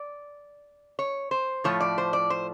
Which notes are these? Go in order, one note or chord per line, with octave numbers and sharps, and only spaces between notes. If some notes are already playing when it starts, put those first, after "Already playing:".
Already playing: D5
C#5
C5
A2 F3 A3 C#5
D5
C5
D5
C5